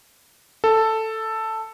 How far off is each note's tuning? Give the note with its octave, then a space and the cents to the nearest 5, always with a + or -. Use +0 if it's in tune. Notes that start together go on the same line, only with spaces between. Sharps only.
A4 +5